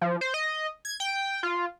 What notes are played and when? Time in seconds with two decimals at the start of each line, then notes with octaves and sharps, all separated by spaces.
0.01 F3
0.21 C5
0.34 D#5
0.85 G#6
1.00 G5
1.43 F4